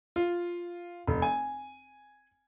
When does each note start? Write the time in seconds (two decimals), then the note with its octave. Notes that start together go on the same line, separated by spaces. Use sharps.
0.16 F4
1.08 F1
1.22 G#5